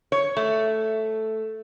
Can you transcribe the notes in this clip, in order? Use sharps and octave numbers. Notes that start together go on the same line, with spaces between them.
C#5
A3